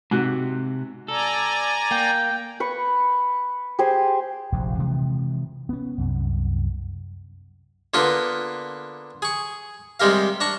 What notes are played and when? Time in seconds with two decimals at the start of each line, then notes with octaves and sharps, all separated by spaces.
0.11 G#2 C3 F#4 F#6
1.08 A4 D5 G#5 A#5
1.91 A#3 G5
2.60 B4 C#6
3.79 G4 G#4 C5 G#5
4.52 F1 A#1 D#2 A#2
4.79 C3 E3 F3 G#3
5.69 B3 C#4
5.98 C2 F#2
7.94 D3 A#3 B3 F4 A#4 B4
9.22 G#4 C#6
10.00 C3 G3 G#3 G4 A#4 F5
10.41 D4 A#5 C#6